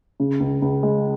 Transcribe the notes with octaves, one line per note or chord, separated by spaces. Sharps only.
C#3
C#2
C#2
G#3